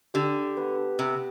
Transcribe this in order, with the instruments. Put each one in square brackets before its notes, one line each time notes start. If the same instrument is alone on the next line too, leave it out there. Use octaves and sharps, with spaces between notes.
[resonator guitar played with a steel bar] D3 [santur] G4
[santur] B3
[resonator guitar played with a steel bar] C3 [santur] B3